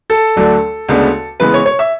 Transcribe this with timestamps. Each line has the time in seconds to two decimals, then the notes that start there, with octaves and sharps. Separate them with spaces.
0.10 A4
0.36 D2 D3 F#3 A3 D4
0.88 D2 C#3 G#3 B3 D4
1.40 C#3 E3 G#3 B3 B4
1.54 C#5
1.66 C#5
1.79 E5